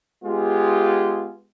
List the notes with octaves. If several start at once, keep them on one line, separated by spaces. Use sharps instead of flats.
G#3 B3 F4 G4 G#4